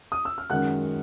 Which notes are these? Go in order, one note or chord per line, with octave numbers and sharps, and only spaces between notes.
D#6
E6
F6
F#2 D#3 G#3 F#5 F#6